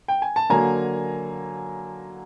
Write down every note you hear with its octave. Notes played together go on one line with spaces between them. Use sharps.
G5
G#5
A5
D3 F#3 A#3 G#5 A#5